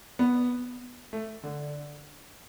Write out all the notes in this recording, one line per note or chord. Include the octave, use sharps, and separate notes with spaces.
B3
A3
D3